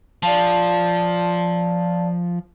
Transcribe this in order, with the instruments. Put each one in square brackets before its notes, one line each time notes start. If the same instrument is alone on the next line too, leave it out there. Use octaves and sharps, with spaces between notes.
[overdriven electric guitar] F3 [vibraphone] D5 F5 A5